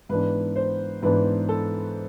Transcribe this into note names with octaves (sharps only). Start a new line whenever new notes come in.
G#2 E3 B3 D4 B4
C5
G#2 E3 B3 D4 B4
A4